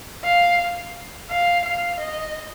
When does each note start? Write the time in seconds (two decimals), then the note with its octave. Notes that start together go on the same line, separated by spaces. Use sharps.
0.25 F5
1.30 F5
1.65 F5
2.00 D#5